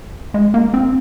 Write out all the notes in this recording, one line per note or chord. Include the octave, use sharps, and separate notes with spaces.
G#3
A#3
C4